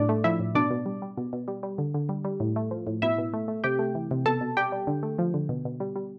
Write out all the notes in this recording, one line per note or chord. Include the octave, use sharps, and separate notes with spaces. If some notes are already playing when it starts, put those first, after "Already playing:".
Already playing: A2 G3 D4 D5
A3
F3 E4 E5
A2
B2 D4 D5
B2
G3
G3
B2
B2
G3
G3
D3
D3
G3
G3
A2
A3
F3
A2
B2 E4 E5
B2
A3
A3
C3 G4 G5
A3
E3
C3
B2 A4 A5
B2
G3 G4 G5
G3
D3
A3
F3
D3
B2
B2
G3
G3